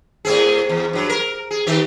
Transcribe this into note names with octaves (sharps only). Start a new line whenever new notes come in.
A2 C4 G#4
E2
G2 F#3
A#4
G#4
D#3 C4 G4